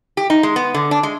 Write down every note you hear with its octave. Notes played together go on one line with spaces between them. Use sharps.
G4
D#4
G#3
B3
D3
D4
G#3